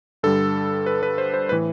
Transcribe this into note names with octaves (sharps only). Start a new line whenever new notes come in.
G2 D3 G3 A4
B4
B4
C5
C5
A2 E3 B4